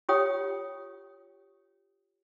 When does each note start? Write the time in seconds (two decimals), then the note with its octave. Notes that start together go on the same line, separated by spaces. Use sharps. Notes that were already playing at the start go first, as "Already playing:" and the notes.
0.09 F4 G4 C#5 G5 D#6